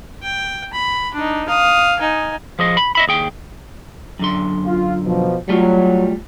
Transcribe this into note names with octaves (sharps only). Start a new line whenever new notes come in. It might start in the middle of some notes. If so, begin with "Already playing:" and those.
G5
B5
D4 D#4
F5 D#6
D#4 G#5
F3 G#4 D#5
B5
D#5 E5 B5
D#2 G#4 G5
F#2 D3 C6
F4
B2 F3
F#3 G3 A3 F4